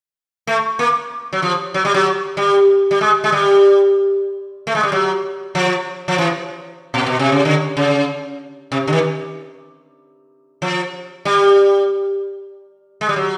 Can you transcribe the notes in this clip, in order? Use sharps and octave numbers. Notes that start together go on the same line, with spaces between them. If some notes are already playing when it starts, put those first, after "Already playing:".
A3
A#3
F#3
F3
F#3
G3
F#3
G3
G3
G#3
G#3
G3
A3
G#3
G3
F#3
F3
F3
E3
A#2
B2
C3
C#3
D3
C#3
C3
D3
D#3
F3
G3
G#3
G3
F#3